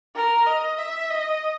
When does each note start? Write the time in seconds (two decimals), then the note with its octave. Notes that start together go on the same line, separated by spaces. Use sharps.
0.15 A#4
0.47 D#5
0.78 E5
1.10 D#5